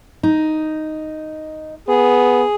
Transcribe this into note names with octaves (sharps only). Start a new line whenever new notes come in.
D#4
B3 G#4